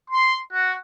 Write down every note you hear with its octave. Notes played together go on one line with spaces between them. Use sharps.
C6
F#4